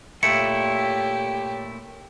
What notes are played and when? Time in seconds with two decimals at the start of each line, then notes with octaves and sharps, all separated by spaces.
0.23 A#2 A3 E4 G4 C#5 C#7